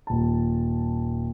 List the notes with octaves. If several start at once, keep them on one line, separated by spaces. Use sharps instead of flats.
D#1 A5